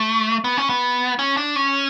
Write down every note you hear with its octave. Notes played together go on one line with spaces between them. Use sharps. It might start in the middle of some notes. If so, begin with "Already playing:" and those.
Already playing: A3
B3
C#4
B3
C#4
D4
C#4